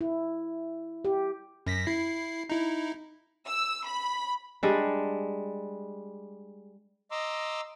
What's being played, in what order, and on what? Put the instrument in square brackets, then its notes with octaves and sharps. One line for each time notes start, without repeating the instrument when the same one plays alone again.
[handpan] E4
G4
[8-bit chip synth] F#2 A#6 B6
E4 C7
D#4 E4
[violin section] E6
B5
[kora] G3 G#3 D4
[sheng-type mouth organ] D#5 A#5 C6 D6 E6